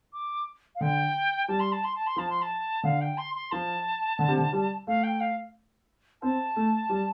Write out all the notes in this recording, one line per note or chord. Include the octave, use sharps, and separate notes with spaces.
D6
F5
D3 G5
G3 A5
C6
A5
C6
A5
C6
F3 A5
C6
A5
D3 F5
G5
C6
C6
F3 A5
D3
C3
D3
G3
A3 F5
G5
F5
C4 A5
A3
G3